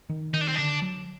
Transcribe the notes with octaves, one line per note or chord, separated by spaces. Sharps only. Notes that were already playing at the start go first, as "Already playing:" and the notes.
D#3
D#3 D#4
D4
C4
D3 D4
F#3